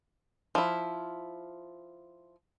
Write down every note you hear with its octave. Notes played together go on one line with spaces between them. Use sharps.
F3 E4